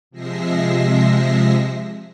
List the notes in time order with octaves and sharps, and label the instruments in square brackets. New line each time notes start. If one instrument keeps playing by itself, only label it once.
[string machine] C3 F3 G#3 E5 A#6 C7